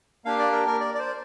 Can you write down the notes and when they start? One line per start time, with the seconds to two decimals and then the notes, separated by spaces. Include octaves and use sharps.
0.25 A#3 D4 G4 F5
0.39 D5
0.52 A#4
0.67 A#4
0.80 D5
0.94 D5
0.99 C5